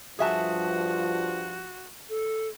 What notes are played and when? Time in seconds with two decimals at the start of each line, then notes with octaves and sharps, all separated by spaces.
0.19 G2 F3 F#4 G#4 E5 A5
2.09 A4